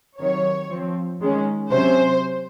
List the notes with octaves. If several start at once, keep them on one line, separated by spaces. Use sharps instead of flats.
C3 D#3 F#3 C#5
F3 C4
D#3 G#3 C#4
C3 F#3 C#4 C5